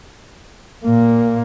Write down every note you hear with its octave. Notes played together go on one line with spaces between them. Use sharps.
A#2 A#3